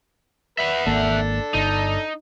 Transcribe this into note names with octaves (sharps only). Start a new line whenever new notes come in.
B4 E5 F#5
G#1 A#3 D4 A4
G1 D#4